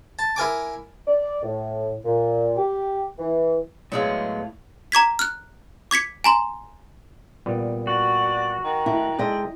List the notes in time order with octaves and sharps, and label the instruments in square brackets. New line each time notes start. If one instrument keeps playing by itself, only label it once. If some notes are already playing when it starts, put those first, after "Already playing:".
[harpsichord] A5
E4 A#4 G#5 D6
[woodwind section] D5
A2
A#2
G4
E3
[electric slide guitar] A2 E4 F5 [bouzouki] F#3 G#3 B3
[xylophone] A#5 D6 G#6 B6
F6 F#6
D6 G#6 B6 C#7
G#5 A#5 C6
[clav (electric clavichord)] A#2 G3 B3
[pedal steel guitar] F#4 [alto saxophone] D5
[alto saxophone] D#3
[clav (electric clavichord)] A3 [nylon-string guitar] E4
[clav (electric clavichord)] G#3 D#4 A4 [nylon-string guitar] E4 D#5 [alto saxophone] G5